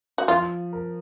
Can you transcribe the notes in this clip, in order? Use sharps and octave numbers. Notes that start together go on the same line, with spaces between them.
F#4
F3 F4
A#4